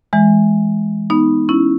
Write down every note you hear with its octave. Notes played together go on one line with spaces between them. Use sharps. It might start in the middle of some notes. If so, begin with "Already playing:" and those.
E3 G#3
B3 D#4
C#4 E4